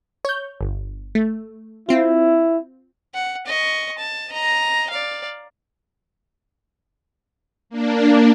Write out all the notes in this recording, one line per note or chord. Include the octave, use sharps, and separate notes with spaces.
C#5 G6
G1
A3
C4 E4 F4
F#5
D#5 C#6
A5
D#5 A#5
D5 F5
A#3 D4